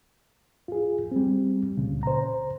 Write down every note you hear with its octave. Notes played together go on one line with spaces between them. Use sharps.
F4 G#4
G3 C4
C#2 A#2 C#3
C5 A#5